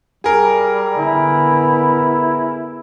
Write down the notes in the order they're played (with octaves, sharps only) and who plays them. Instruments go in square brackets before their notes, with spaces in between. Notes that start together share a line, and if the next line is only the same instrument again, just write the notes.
[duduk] G3 [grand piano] G#4 A#4
[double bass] D3 B3 [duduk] E4